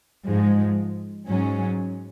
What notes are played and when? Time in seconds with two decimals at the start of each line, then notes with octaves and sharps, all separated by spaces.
0.26 G#2 F3 G#3
1.28 G#2 F#3 C#4